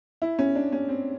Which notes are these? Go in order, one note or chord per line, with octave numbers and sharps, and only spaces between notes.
E4
C#4
D4
C#4
C4